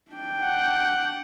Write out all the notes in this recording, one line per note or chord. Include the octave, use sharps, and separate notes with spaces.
D4 G5
F#5